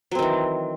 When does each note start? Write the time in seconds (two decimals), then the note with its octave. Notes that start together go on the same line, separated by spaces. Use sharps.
0.11 F#3
0.15 C4
0.19 D#3
0.22 E3